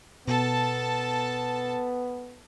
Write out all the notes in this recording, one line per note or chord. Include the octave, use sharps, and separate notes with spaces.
B2 B3 A4 A5